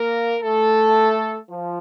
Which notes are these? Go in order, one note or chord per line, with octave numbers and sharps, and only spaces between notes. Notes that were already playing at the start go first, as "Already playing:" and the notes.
Already playing: A#3 A#4
A3 A4
F3